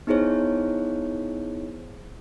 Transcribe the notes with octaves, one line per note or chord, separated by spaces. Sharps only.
B3 D#4 E4 G#4 C5 C#5